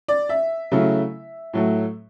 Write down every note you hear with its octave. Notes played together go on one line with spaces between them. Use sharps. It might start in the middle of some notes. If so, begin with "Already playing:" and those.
D5
E5
C#3 F#3 A3 E4
A2 F#3 A3